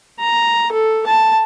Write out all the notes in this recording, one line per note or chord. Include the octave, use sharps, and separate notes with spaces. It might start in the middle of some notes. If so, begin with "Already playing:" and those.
A#5
A4
A5